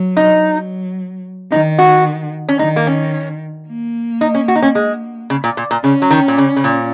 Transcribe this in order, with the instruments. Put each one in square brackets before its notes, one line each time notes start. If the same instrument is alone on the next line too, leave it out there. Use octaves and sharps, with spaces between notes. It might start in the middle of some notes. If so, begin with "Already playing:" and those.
Already playing: [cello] F#3
[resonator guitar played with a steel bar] D#4
[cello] F#3
[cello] D#3 [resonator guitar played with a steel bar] D#4
[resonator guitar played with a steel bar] F#4
C#4
[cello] D#3 [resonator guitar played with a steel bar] D#4
[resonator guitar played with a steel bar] A#3
C#4
[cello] A#3
[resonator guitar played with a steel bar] D#4
C#4
F#4
D#4
C#4
G#3
C#3
A#2
A#2
A#2
[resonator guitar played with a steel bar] C#3 [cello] C#4
[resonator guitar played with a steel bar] F#3
D#3
A#2
C#3
C#3
A#2